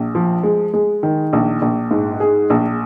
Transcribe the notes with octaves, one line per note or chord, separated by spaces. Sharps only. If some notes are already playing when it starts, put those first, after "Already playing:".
Already playing: A#1
F3
G#3
G#3
D#3
A#1
A#1
G#2
G#4
A#1